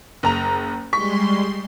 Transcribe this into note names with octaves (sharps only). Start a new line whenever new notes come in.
F#1 A#5 F7
G3 G#3 C6 C#6 B6